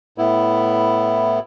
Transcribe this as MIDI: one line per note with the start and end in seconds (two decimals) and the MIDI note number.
0.18 1.39 45
0.18 1.39 59
0.18 1.39 64